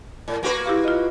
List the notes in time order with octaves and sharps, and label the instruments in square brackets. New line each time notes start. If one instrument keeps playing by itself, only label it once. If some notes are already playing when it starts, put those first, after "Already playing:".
[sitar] A2
A#3 F#4 B4
[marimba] E4 G4 F5
F4 D#5